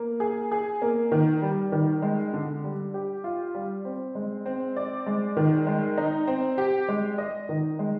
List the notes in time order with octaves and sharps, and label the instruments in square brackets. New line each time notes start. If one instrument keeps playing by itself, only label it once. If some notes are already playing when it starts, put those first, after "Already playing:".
Already playing: [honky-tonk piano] A#3
G#4
G#4
A#3
D#3
G3
D#3
G#3
D3
G3
G4
F4
G3
C4
G#3
C4
D5
G#3
D#3
G#3
D#4
C4
G4
G#3
D#5
D#3
G#3